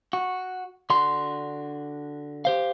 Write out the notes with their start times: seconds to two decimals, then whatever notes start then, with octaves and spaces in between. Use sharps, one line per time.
0.13 F#4
0.90 D3 D4 F#4 C6
2.45 G4 C5 F5